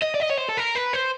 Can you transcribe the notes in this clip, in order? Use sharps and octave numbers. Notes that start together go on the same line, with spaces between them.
D#5
D5
D#5
C#5
C5
A4
A#4
B4
C5